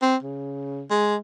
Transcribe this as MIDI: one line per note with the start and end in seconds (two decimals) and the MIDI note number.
0.02 0.16 60
0.23 0.83 49
0.90 1.15 56